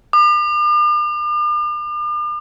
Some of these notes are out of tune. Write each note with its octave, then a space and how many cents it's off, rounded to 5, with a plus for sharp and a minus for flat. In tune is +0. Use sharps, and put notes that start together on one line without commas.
D6 +45